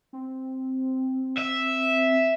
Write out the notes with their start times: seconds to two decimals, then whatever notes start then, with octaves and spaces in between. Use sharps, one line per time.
0.13 C4
1.38 E5